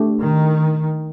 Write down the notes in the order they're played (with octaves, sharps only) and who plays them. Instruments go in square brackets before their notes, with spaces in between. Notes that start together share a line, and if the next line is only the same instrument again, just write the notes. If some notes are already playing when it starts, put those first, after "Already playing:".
Already playing: [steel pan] A3 D4 G4
[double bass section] D#3